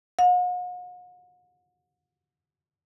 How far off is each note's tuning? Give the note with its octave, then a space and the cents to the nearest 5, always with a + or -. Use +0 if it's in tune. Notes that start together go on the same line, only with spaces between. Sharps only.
F#5 -45